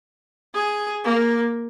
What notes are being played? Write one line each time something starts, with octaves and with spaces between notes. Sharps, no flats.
G#4
A#3